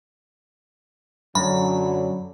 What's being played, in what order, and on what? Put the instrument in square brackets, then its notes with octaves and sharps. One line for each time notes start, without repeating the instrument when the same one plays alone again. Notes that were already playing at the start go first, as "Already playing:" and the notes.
[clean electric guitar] F#2 [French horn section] D3 F#3 [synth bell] B5